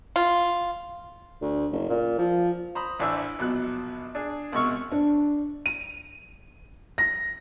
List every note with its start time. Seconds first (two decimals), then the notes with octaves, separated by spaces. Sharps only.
0.16 F4
1.41 D2
1.71 F#1
1.89 A#2
2.18 F3
2.75 C5 A#5 B5 D#6
3.00 A1 E3 D4 E4 C5 E5
3.39 A#1 B2 F#3 F#6
4.15 D4 G#4
4.52 C2 B2 G#3 E5 C#6 F6
4.92 D4
5.66 D#7
6.98 A#6